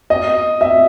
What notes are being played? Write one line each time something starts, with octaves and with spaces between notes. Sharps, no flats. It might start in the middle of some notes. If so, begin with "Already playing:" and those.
D#5
E5